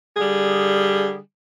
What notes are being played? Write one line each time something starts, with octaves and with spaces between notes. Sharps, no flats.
D3 G3 G#4